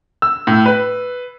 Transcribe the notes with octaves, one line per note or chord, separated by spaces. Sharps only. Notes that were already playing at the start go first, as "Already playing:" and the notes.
E6
A2
B4